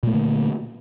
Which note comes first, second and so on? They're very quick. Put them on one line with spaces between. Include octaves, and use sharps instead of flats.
A#2 A3 A#3 D3